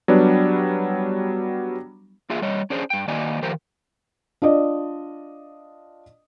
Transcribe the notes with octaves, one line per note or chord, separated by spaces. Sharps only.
F#3 G3 B3 D4
A#3 F4 G#4 E5
G3 C#5 D#5
C#4 D4 G#4 C5
G2 G5
D#3 A#3 F#4 D5 D#5 G#5
D#3 F3 G4 A#4 C5
D4 F4 D5 D#5